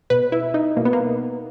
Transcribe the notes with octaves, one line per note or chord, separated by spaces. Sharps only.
B2 B4
E4
D#4
B2 A#3
B3
A#3